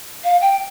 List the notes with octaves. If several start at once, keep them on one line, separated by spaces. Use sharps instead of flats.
F5
G5